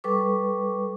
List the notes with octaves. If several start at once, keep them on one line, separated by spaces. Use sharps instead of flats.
G3 A4 B4 C#6 D6